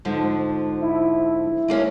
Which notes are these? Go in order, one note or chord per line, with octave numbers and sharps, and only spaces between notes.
G#2 D3 F3
E4
G#3 A#3 C#4